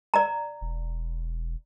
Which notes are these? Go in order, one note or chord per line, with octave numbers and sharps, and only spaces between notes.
D5 A#5
E1